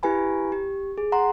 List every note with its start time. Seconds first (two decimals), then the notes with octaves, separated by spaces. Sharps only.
0.03 E4 G4 B4 G#5 B5
0.52 G4
0.98 G#4
1.12 F#5 A#5 C6